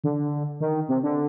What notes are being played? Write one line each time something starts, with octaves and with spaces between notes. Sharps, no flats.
D3
D#3
C3
D3